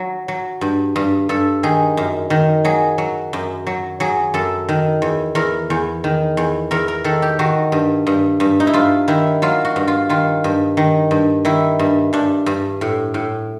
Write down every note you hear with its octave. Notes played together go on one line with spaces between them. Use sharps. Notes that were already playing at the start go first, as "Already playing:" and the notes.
Already playing: F#3
F#3
G2
G2
G2 A4
D#3 G#4
F#2
D#3
F#3 G#4
F#3
F#2
F#3
F#3 G#4
F#2 A4
D#3
E2
E2 A#4
E2
D#3
E2
E2 A#4
A#4
D#3 A4
G4
D#3 F#4
G2
G2
G2
D#4
E4
G2 F4
D#3 E4
F#3 F4
F#4
G2
F4
D#3 F4
G2
D#3
G2
D#3 E4
G2
G2 D4
G2
A2
A2